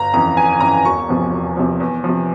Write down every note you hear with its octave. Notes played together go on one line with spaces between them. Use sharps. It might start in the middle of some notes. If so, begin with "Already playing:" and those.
Already playing: G1 A#5
F2 C#3 E3 A#5
G1 G#5
F2 C#3 E3 A#5
E1 C#6
E2 C3 F3
E1
E2 C3 F3
E2
C3 F3